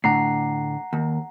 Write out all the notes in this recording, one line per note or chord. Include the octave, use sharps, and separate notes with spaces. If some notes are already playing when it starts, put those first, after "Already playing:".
A2 D3 F#5 A#5 C7
D#2